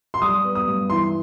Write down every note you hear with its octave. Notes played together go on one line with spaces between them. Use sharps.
C6
G3 D#6
B3
D#6
G2
E3 C6